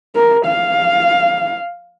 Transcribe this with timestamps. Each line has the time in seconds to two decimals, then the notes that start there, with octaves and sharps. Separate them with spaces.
0.16 A#4
0.46 F5